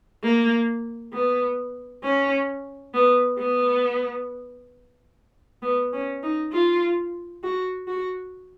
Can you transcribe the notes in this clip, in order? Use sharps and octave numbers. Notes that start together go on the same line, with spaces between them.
A#3
B3
C#4
B3
B3
B3
C#4
D#4
F4
F#4
F#4